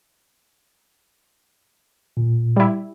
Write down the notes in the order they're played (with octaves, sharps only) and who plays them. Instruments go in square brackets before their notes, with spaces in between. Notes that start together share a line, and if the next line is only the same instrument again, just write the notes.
[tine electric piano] A#2
[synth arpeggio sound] G3 E4